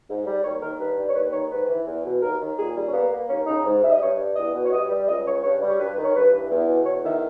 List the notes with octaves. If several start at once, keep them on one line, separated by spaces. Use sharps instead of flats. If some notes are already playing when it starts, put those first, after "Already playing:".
G#2
G3
D#2 C#5
D#3 A#4
G2 B4
G3
C#5
D#2 B4
D#3 C#5
G#2 B4
E3
E2
B2
D#2 A#4
D#3
A#2 G#4
G3
C#4
A#3 B3
A#3
D#2 C#4
C#3 D#4
G#2
G3 E5
D#5
G2 C#5
G3
E2 D#5
B2
C#5
G2 D#5
G3
C#2 D#5
C#3 C#5
G2 C#5
G3
C#5
G2 B4
D#3
C#5
G2 B4
E3
E2
B2
E2 C#5
D#3 E5